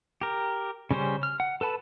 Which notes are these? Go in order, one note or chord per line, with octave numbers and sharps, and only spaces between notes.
G4 A#4
C#3 G3 C#4 C5
F6
F#5
A4 B4 A5 B5